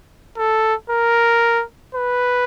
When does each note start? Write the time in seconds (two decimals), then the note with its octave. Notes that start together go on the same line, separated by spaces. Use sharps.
0.38 A4
0.90 A#4
1.95 B4